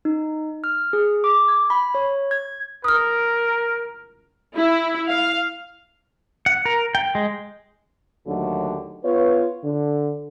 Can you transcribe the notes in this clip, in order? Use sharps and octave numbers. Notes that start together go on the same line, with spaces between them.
D#4
F6
G#4
D6
G#6
B5
C#5
G#6
A#4 D#6 F6
E4
F5
F#5
A#4
G5
G#3
D#2 D3 F#3 A3
B3 F4 B4 C#5
D3